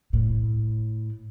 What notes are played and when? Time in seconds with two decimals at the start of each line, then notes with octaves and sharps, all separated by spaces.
0.13 A2